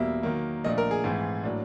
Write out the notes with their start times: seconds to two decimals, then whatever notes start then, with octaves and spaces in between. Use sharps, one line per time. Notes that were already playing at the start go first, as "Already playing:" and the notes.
Already playing: E2 B2 G3 A#3 E5
0.23 D#3 F#3 A#3
0.64 A#2 F3 A3 D4 D#5
0.78 A#4
0.91 G#4
1.04 G#2 E3 A3 C4
1.43 A2 F#3 A#3 D4